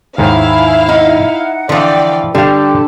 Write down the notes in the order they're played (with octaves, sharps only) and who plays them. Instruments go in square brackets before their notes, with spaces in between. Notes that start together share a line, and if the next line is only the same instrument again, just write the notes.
[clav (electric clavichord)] D#2 G#2 D#3 [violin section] E4 F5 [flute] G#5
[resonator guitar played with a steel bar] D#4 [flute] F#5
[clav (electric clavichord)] D3 [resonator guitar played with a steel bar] E3 F3 [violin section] D5 F5 G5
[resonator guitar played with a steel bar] D3 [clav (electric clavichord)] G3 F5 [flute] G4 [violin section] A4